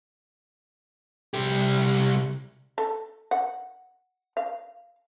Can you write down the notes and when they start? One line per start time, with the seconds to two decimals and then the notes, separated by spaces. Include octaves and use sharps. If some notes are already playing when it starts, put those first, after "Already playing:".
1.34 C2 G4
2.78 A4
3.31 F#5
4.37 F5